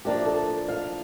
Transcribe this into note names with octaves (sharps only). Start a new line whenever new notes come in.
A2 F3 A#3 D4 G4
A4
F5